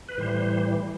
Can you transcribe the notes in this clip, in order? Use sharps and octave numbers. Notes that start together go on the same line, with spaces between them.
B4
A2 E3 G3 C5